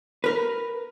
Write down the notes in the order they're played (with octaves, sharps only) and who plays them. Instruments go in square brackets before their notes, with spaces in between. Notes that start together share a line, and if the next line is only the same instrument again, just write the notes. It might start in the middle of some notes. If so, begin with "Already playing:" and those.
[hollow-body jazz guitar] A#4 B4